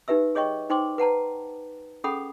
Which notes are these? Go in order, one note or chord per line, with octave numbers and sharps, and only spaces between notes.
D#4 G4 B4 E5 E6
G#4 C#5 D#5 G5 C#6
D#4 C5 G5 C6 D6
B4 F#5 A5 A#5
C#4 G#4 A4 F#5 B5 D#6